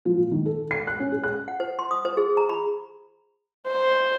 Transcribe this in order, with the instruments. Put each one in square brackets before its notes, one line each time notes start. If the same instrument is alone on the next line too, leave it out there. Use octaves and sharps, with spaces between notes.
[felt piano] F3
A#2
D#3
A4
C7
F#6
C#4
G#4
F#6
[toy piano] F#5
C5
C6
D#6
C5
G#4
A#5
B5
[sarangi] C5